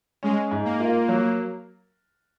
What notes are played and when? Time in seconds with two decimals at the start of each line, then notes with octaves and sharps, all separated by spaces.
0.23 G#3 C#4
0.51 G#2
0.65 A#3
0.80 F4
1.08 F#3